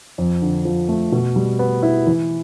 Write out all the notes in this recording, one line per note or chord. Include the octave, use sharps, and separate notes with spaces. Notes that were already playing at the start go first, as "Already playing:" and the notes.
F2
D3
F3
A3
B2
G3
B3
E4
E3